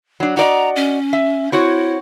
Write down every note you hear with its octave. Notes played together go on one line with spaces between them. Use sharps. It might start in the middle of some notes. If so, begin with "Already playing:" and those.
F#3 D4
F#4 D5 D#5 A#5
C#4
E5
C4 E4 F#4 C#5